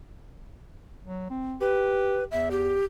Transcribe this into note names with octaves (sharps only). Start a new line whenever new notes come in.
F#3
C4
G4 B4
E2 E5
G4